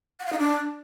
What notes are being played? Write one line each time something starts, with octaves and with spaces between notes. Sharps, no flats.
F#5
F5
D#4
D4